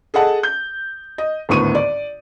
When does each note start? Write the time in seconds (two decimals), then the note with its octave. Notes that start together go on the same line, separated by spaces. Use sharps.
0.14 G#4 A4 D#5 F#5 A5
0.43 G6
1.18 D#5
1.49 G#1 D2 A2 B3 C#6 D#7
1.75 D5